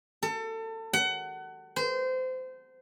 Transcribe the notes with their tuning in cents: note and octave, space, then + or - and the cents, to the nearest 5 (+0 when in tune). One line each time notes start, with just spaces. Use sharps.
A4 +30
F#5 +25
C5 -25